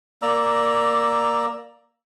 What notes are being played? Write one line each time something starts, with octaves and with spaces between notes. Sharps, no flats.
A#3 D5 A#5 E6